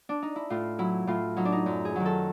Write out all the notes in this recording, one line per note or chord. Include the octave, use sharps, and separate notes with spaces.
D4
D#4
E4
A2 F4
F#3 E4
A2 F4
F#3 D#4
D4
D#4
F#2
G#4
D#3 F#3
A4